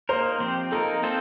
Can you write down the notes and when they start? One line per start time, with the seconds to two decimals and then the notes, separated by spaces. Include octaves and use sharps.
0.09 A#3 D#4 A#4 C5
0.40 F3 C4 G4 C5
0.72 A#3 D#4 A4 A#4
1.03 C4 F4 A4 C5